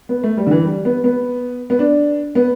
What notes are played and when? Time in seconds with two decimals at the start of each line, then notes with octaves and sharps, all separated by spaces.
0.09 B3
0.23 A3
0.37 G3
0.47 D3
0.51 E3
0.65 G3
0.85 B3
1.04 B3
1.70 B3
1.79 D4
2.35 B3